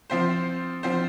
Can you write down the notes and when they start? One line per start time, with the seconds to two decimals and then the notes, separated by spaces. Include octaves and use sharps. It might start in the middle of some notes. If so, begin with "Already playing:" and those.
0.10 F3 C4 F4 C5
0.83 F3 C4 F4 C5